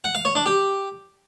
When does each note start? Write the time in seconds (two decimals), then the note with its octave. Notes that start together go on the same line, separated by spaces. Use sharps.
0.04 F#5
0.15 F5
0.25 C#5
0.35 D4
0.46 G4